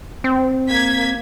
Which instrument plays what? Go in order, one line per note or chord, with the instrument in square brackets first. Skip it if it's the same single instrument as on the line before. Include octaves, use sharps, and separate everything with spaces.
[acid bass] C4
[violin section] A#3 G#6 B6